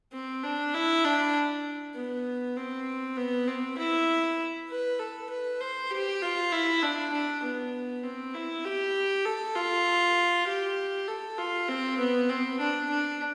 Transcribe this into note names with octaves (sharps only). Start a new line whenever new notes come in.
C4
D4
E4
D4
B3
C4
B3
C4
E4
B4
A4
B4
C5
G4
F4
E4
D4
D4
B3
C4
E4
G4
A4
F4
G4
A4
F4
C4
B3
C4
D4
D4